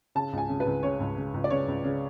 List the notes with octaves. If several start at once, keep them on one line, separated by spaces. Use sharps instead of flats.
C#3 A5
C#2 G#5
C#3
B4
C#2
C#3 C#5
C#2
C#3
C#2
D5
C#3 C#5
C#2
C#3